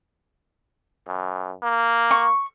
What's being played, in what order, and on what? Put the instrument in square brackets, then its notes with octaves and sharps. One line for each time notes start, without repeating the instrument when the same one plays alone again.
[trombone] F#2
A#3
[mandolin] C#6